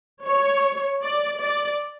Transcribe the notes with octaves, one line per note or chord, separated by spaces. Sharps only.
C#5
D5
D5